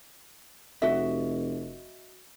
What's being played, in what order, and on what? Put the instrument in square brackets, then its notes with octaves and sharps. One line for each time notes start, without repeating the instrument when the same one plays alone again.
[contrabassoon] F1 [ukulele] F#4 D#5 E5